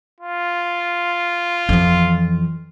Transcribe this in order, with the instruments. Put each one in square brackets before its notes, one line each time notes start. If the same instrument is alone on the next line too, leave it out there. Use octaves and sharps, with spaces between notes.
[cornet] F4
[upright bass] F2 E3